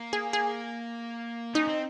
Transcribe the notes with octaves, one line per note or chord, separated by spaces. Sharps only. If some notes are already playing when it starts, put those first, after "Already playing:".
Already playing: A#3
G#4
G#4
C#4 D#4
C4